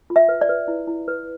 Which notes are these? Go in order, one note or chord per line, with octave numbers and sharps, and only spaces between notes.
F4
E5
B4
D5
B4
E4
E4
B4